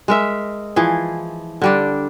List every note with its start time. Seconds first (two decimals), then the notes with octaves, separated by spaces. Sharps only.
0.08 G#3 A#4 E5
0.76 E3 F3 G#4
1.62 D3 G3 D4